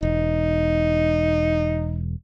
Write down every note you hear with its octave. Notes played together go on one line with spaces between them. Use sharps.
E1 D#4